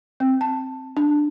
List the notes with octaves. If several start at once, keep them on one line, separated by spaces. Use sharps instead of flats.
C4
A5
D4